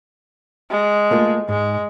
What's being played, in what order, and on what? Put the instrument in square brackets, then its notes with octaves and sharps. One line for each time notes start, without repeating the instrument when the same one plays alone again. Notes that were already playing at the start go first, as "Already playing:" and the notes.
[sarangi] G#3
[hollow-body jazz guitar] A3 A#3 F4
[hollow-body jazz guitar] G#2 [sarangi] G#3